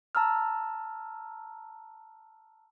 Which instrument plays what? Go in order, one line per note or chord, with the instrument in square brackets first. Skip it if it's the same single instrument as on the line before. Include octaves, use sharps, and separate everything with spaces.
[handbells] A5 A#5 E6 F6